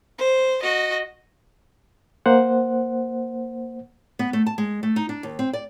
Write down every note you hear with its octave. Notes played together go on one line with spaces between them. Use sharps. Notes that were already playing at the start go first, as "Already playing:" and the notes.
C5
F#4 D#5
A#3 C5 F#5
B3
A3
A5
G#3
A3
D#4
D4
D#2
C4
D5